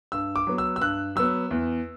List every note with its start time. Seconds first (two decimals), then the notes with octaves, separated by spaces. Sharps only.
0.12 G2 E6
0.36 D6
0.47 F#3 B3
0.58 E6
0.76 E6
0.81 G2 F#6
1.16 F#3 B3 E6
1.51 E2